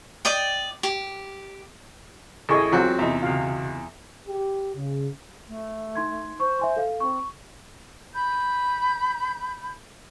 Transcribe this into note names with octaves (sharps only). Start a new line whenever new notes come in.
D5 D#5 G5
G4
A1 E4 G#4 A4 D#5 C#6
E2 F#3 C4 F4 F#4
E2 C3 D#4 E5
C#2 B2 F5
G4
C#3
A3
D#4 C6 G#6
C5 C#6
E5 G#5 C6
A4 F5
C4 C#6
B5 G6